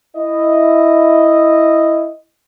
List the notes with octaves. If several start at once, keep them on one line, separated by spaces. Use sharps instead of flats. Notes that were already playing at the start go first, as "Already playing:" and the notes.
E4 D#5